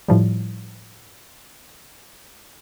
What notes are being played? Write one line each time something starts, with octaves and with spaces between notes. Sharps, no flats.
A2 F3 G3